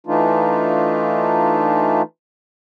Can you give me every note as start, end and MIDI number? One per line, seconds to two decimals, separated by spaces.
0.07 2.02 52
0.07 2.02 57
0.07 2.02 62
0.07 2.02 63
0.07 2.02 65